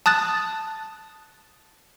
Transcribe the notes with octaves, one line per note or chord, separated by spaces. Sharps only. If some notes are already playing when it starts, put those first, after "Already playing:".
A5 D#6 F#6 A6